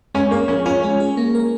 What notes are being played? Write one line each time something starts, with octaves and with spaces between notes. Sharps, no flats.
G#3 C#4
A#3 G#4
F3 C#4
C#4 F4
G#3
G#4
A#3
A#4